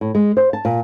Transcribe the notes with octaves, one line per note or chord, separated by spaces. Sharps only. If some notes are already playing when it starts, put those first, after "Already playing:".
A2
G#3
C5
A5
A#2